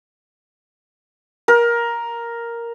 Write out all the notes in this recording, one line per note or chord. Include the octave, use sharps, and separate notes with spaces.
A#4